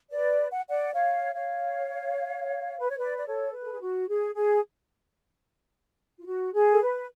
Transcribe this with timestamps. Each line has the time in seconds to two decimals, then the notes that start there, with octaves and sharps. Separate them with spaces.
0.10 B4 D5
0.52 F#5
0.69 D5 F#5
0.93 C#5 F5
1.34 C#5 F5
2.78 B4
2.89 C#5
2.98 B4 D5
3.17 D5
3.26 A4 C#5
3.52 B4
3.63 A4
3.72 G#4
3.81 F#4
4.08 G#4
4.34 G#4
6.20 F4
6.26 F#4
6.54 G#4
6.72 A4
6.81 B4